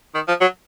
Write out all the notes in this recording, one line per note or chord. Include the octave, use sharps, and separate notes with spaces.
D#3
F3
F#3